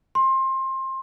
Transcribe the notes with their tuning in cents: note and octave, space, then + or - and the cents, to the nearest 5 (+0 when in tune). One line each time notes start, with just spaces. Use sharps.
C6 +25